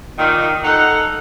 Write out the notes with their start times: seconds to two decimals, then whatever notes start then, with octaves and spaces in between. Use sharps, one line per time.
0.18 A#2 D#3
0.64 D#4 A4 F#5